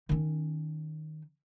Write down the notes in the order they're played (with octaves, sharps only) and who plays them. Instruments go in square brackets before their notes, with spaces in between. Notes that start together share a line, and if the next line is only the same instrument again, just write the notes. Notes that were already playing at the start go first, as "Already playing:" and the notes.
[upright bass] D#3 C#4